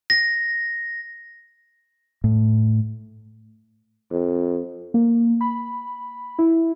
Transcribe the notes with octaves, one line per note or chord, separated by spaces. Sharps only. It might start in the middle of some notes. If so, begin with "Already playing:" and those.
A#6
A2
F2
A#3
B5
E4